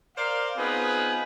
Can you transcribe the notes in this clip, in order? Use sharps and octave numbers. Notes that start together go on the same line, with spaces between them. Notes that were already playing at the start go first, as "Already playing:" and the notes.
A#4 C5 D5 F5
B3 C4 D#4 F4 G#4 B4